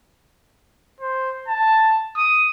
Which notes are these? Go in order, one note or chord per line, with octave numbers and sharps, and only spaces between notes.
C5
A5
D#6